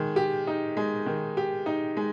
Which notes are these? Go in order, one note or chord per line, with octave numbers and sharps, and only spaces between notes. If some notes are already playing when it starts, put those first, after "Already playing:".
Already playing: D#3 G#3
G4
D#4
G#3
D#3
G4
D#4
G#3